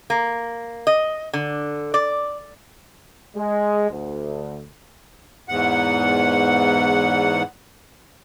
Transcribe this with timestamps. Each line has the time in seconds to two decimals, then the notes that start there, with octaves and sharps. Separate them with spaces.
0.10 A#3
0.87 D#5
1.33 D3
1.94 D5
3.35 G#3
3.90 D2
5.49 E2 G#2 F#5